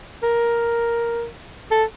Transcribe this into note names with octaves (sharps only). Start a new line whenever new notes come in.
A#4
A4